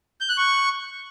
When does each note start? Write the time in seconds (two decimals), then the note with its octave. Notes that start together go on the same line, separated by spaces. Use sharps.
0.21 G6
0.29 F#6
0.38 C#6